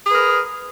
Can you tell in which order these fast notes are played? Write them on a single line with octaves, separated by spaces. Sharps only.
G#4 B4 A#4